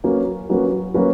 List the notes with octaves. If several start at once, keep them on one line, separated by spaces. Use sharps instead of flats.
F#3 A#3 C#4 F#4 B4
F#3 A#3 C#4 F#4 B4
F#3 A#3 C#4 F#4 B4